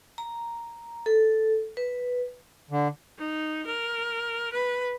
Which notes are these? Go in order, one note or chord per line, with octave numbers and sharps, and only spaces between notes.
A#5
A4
B4
D3
D#4
A#4
B4